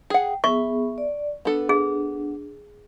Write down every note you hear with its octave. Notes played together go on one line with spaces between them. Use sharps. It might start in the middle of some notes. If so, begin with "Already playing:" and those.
G#4 F#5 G5
B3 G#4 E5 C#6
D5
B3 D4 A4
G#4